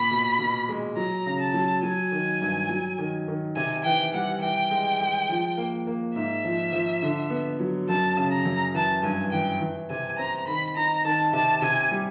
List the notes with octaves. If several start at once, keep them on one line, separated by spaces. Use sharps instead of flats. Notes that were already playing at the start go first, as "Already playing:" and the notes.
Already playing: A#2 B5
B2
B2
G#3
F#3 A#5
C#3
A5
F#3
F#3 G#5
D#3
G2
F#3
D#3
D#3
C3 G#5
E3 G5
G3 F#5
E3 G5
G#3
G#3
F3
A#3
A#3
G#2 E5
F3
F3
D3
B3
F#3
F#2 A5
C#3
A#5
F#2
E3 A5
G2 G#5
E3 G5
E3
C3 G#5
C4 A#5
D#3 B5
D#4 A#5
D#3 A5
C3 A5
C3 G#5
G3